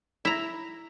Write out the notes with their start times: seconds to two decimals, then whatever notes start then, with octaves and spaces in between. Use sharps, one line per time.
0.25 E4 A#5